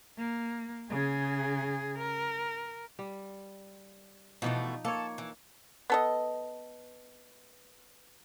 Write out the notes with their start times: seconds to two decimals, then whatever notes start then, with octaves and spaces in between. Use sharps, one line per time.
0.18 A#3
0.90 C#3 G#4
1.99 A#4
2.99 G3
4.42 B2 E3 F3 A3 D#4 D5
4.85 A#3 A4 C#5
5.18 E3
5.90 B3 A4 D#5